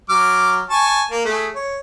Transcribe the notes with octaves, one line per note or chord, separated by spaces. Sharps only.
F#3 D6 F6
G#5 A5 C#6
A#3
A3 G#4
C#5